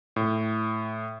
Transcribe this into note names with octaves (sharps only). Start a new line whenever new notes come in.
A2